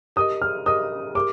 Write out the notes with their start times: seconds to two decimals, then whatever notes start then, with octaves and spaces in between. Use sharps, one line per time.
0.16 G4 A#4 D#5 D#6
0.42 F6
0.66 G4 A#4 D#5 D#6
1.15 G4 A#4 D6